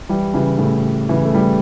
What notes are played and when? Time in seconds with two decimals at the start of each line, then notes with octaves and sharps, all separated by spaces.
0.09 E3 G3
0.34 C#3 E3
0.59 A2 C#3
1.09 C#3 E3
1.25 A3
1.34 E3 G3